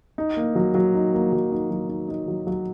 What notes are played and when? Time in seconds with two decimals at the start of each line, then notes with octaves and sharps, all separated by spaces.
0.18 D#4
0.37 A#3
0.55 F#3
0.74 F#3
0.95 D#4
1.13 A#3
1.32 F#3
1.52 D#4
1.70 F#3
1.89 D#4
2.08 D#4
2.28 F#3
2.47 F#3